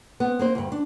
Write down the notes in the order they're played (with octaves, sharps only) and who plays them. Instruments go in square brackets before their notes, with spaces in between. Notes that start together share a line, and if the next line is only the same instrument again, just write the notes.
[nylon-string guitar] B3 C4
A#3 C4 C5
D2 G2
D4